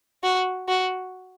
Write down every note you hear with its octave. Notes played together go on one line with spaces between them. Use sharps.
F#4
F#4